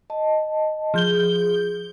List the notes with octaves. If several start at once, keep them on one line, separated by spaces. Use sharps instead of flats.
D#5 A5
F3 G#4 G6 G7